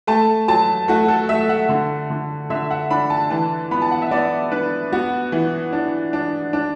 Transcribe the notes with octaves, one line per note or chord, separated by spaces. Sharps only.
A3 A5
F#3 A5
A3 F#4
A4
A3 E5
F#5
D3
D3
D3 E5
F#5
D4 B5
A5
E3 A5
B3 B5
A5
F#5
E5
B3 D5
D4 B4
B3 F#4
E3
D4
D4
D4